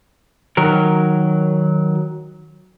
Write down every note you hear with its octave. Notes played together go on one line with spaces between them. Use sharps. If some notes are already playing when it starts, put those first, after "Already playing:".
D#3 F#3 A#4